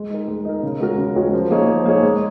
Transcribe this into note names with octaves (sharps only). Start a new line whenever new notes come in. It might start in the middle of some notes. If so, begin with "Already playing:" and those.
Already playing: G#3
D#4 A#4
G#3
D#4 A#4
C#3
G#3 C#4 F#4 A#4
C#3
G#3 C#4 F#4 A#4
F3
A#3 D#4 G#4 C#5
F3
A#3 D#4 G#4 C#5
G#3